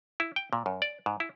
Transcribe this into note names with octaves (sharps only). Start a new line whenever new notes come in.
E4
G5
A#2
F#2
D5
G#2
E4